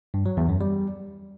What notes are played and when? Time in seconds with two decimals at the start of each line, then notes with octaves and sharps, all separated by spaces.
0.14 G2
0.26 F#3
0.37 E2
0.49 F#2
0.61 G3